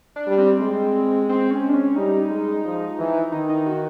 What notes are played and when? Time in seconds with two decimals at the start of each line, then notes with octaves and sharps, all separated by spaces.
0.16 D4
0.27 G3
0.38 C4
0.60 G#3
1.29 C4
1.51 C#4
1.69 D4
1.74 C#4
1.96 G3 D#4
2.30 G#3
2.64 F3
2.98 E3
3.32 D#3 D#4
3.49 D#4
3.66 F#4